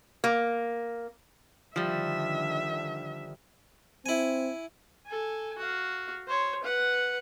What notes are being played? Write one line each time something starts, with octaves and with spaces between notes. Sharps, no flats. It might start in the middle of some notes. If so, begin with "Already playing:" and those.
A#3
D3 D#3 F3 G3 E5
C4 E4 G#5
A4 G#5
F#4 F5
C5 C#5
B4 F#5